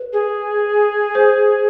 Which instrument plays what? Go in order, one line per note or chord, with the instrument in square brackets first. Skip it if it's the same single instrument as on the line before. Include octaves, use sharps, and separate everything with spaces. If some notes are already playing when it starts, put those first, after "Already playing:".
Already playing: [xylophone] B4
[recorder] G#4
[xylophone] C5